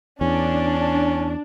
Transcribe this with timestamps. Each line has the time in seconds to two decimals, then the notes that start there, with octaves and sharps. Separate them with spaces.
0.21 E2 C#4 D4